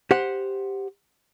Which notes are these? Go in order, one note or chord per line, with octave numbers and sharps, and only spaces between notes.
G4 C5 F#5